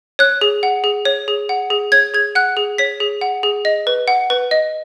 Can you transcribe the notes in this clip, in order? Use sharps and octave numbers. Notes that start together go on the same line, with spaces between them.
C#5 F#6
G#4
F#5
G#4
C#5
G#4
F#5
G#4
C#5 G#6
G#4 G#6
F#5 F#6
G#4
C#5 B6
G#4
F#5
G#4
D#5
B4
F#5
B4
D#5